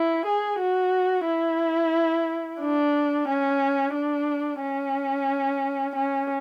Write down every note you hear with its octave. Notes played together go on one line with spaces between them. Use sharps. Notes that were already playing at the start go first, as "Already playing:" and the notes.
Already playing: E4
G#4
F#4
E4
D4
C#4
D4
C#4
C#4